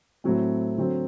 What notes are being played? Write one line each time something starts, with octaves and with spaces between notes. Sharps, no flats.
A2 F#3 C4
D3 F#3 C4